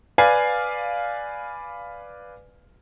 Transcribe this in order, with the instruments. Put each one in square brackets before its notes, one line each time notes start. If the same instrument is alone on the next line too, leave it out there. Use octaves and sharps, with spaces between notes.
[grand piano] B4 D5 F5 G#5